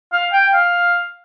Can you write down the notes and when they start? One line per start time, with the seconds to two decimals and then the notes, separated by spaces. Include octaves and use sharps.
0.12 F5
0.33 G5
0.53 F5